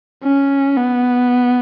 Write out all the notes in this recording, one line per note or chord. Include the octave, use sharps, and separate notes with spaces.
C#4
B3